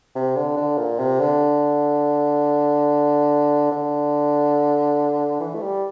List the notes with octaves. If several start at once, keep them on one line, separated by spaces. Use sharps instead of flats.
C3
D3
D3
A#2
C3
D3
D3
E3
A3
G3